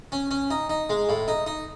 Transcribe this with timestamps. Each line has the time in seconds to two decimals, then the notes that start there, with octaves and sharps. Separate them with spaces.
0.12 C#4
0.31 C#4
0.51 D#4
0.70 D#4
0.90 G#3
1.09 A2
1.28 D#4
1.47 D#4